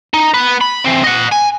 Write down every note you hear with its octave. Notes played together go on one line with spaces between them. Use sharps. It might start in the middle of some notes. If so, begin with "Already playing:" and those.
D#4
B3 B4
B5
E3 C4
D#5 F#5
G#5